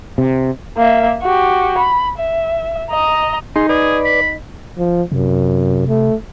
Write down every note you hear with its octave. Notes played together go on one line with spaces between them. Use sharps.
C3
A#3 E5
F#4 G4
B5
E5
D#5 A#5
D#4 G#4 C6
G#4 B4 D5
B5
F3
F#2 C3
A3